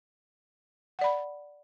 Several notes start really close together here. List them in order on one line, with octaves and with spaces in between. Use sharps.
F#5 D5 B5